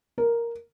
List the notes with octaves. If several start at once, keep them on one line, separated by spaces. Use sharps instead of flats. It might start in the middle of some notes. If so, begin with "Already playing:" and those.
A#4